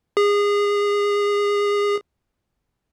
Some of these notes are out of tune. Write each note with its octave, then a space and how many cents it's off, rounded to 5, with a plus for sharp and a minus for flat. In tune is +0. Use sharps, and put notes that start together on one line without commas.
G#4 -25